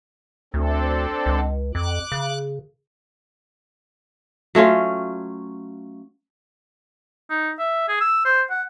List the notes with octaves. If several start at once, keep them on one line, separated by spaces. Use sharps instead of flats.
D2 C4 D4 A4
C#2
F2 D6 F#6
C#3
F#3 A3 C#4 F4
D#4
E5
G#4
E6
C5
F#5